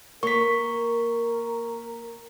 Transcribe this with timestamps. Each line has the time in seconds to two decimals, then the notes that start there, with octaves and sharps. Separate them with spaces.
0.23 A#3 A#4 C#6 B6